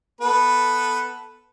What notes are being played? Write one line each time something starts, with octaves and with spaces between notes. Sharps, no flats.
B3 A4 B4